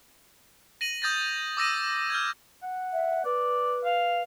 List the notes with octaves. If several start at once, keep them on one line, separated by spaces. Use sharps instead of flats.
A#6 D#7 F#7
D#6 G6 A6 A#6
D6 E6 A#6 D#7
F6 G6 G#6
F#5
E5
B4 D5
F5